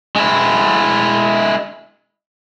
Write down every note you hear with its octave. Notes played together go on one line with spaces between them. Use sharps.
G#3 E4